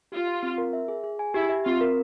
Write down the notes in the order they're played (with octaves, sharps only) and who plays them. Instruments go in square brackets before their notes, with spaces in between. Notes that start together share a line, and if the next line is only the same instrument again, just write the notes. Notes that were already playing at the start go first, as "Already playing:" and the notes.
[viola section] F4 [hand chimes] G4
[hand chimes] F5
C4
A#4
E5
G#4
G#4
G#5
[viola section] E4 [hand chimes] G4
[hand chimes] E5
[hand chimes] C4 [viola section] F4
[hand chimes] A#4